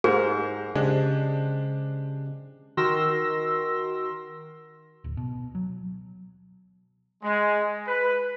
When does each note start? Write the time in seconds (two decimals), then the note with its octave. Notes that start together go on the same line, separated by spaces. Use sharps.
0.04 G#2 G4 G#4 A#4 C5
0.76 C#3 G#3 D4 G4 C5
2.77 D#3 F#4 A#4 C6 E6 A#6
5.04 D1
5.17 B2
5.55 F#3
7.23 G#3
7.87 B4